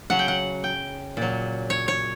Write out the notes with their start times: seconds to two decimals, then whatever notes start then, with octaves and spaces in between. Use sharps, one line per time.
0.10 C#3 F#3 F#5
0.19 G5
0.28 F#5
0.64 G5
1.17 A#2 F#3
1.70 C#5
1.88 C#5